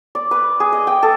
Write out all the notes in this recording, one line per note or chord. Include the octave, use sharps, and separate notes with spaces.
D5
B4
G#4
D#5
G5
A4